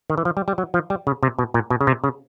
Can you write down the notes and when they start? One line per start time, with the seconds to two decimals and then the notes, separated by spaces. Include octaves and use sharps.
0.10 D#3
0.18 E3
0.25 F3
0.37 G3
0.48 G3
0.58 F#3
0.74 F3
0.90 G3
1.07 C#3
1.23 C3
1.39 B2
1.54 A#2
1.70 B2
1.81 C#3
1.87 C3
2.04 C#3